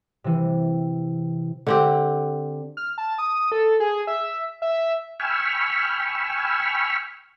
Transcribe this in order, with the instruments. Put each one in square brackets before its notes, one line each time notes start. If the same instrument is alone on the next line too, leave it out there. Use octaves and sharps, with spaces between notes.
[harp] C3 E3
[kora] D3 C4 G4
[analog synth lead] F6
A5
D#6
A4
G#4
E5
E5
[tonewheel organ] G5 G#5 B5 C#6 E6 F6